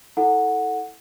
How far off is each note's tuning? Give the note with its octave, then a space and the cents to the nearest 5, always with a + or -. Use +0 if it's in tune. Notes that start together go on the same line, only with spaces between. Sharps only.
E4 -20 A4 +0 F#5 -10